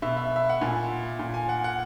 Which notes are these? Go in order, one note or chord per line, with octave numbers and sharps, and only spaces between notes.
B2 E5
E5
E5
F#5
A#2 G#5
A#2
G#5
F#5
F#5